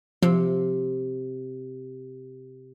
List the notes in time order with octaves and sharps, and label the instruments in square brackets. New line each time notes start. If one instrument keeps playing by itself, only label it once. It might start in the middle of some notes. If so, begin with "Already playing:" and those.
[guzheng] C3 [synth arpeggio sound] F3